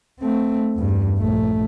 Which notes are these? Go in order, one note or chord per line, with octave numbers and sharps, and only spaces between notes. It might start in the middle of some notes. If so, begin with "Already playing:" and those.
A3 C4
E2 G2
A#1 A3